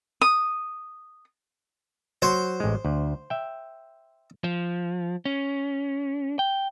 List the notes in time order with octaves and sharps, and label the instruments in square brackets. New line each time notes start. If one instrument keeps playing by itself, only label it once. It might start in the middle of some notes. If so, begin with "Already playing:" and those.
[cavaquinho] D#6
[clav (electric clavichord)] F#3 F#4 [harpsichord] C5
[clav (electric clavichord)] A1 G#3
D2
E5 G5
[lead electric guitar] F3
C#4
G5